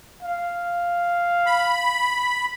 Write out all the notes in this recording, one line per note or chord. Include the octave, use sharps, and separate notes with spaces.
F5
B5